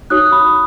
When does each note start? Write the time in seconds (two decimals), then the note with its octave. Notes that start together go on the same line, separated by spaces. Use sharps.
0.10 D#4 F#4 C#5 D#6 F#6
0.32 B5 D#6